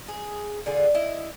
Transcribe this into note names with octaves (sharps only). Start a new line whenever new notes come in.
G#4
D3 F4 G#4
E4 D#5